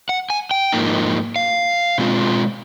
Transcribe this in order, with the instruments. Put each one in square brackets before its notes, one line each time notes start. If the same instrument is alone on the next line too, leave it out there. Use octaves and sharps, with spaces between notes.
[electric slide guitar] F#5
G#5
G5
G#2 F3 A#3 D#4
F5
B2 G#3 C4 F4